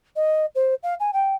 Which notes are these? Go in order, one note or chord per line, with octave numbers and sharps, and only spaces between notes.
D#5
C5
F5
G#5
G5